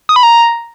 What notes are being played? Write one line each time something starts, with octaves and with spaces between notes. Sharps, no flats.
D#6
B5
A#5